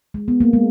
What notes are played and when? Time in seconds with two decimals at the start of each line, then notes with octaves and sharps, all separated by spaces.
0.14 G#3
0.28 B3
0.41 A#3
0.53 G#3